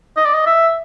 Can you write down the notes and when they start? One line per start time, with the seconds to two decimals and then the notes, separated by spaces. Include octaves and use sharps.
0.17 D#5
0.25 D5
0.34 D#5
0.46 E5